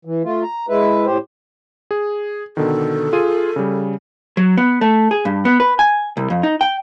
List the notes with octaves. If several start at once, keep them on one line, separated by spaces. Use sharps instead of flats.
E3
A3 F4
A#5
G#3 E4 B4
A2 G4 C5
G#4
B2 D3 D#3 A4
F4 G#4 D#7
C#3 G3
F#3
B3
A3
G#4
G2
B3
B4
G#5
C2
F2
D#4
G5